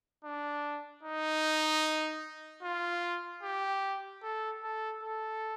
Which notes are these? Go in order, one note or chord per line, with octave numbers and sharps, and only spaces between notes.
D4
D#4
F4
G4
A4
A4
A4